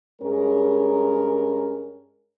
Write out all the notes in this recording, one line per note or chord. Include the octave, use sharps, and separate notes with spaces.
G2 G#3 C#4 G#4 A#4